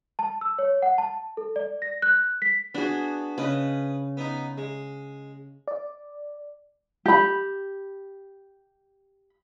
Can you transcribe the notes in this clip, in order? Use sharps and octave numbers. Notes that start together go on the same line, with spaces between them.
A5
E6
C#5
F#5
A5
A4
D5
A#6
F#6
B6
B3 D4 F#4 G#4
C#3 B4 D#5
B3 D#4
G#3
D5
G4 B5